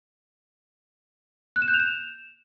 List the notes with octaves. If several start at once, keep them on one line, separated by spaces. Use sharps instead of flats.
F#6
E7
G6
F7
E7